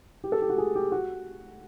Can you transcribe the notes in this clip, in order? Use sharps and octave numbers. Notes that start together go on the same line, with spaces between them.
G4
A4
G4
F#4
G#4
G4
F#4